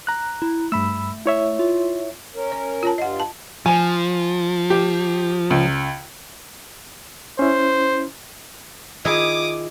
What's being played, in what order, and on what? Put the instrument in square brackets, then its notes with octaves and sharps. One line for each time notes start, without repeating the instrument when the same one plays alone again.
[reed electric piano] A#5 F#6
[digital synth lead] E4
[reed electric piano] G2 B5 E6 [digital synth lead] A3
[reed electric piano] E4 C#5 E5
[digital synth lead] F4
[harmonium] C#4 A#4
[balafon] C#5
F4 C#5 A5
[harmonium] G2 F4 [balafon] D#5 F#5
[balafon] A5
[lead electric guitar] F3 [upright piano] G#5
[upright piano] G4
C#2
[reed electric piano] C#4 E4 [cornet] C5
[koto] D#3 E4 G#4 [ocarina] F4 [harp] D#5 [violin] D6 D#6